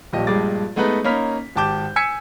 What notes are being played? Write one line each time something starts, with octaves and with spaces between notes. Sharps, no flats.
D#1 A#1 G4 D#5
A#1 G2 G3 G#3 D6 A6
G#3 A3 B3 D#4 B4
A#3 C#4 D#4 B5 F6 B6
G#1 G4 A5 D6 G6
G#5 E6 G#6 B6 C#7